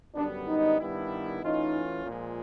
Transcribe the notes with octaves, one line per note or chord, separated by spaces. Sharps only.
F#2 D3 G3 B3 D4
D#4
G2 D#3 G3 B3 E4
E3 A3 C#4 D#4 F4
A#2 F3 G#3